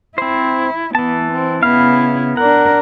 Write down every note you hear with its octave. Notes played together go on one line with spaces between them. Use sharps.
C4 E4 C5
E3 B3 A5
C4
C#3 B3 E4 F5
D4 A#4 F#5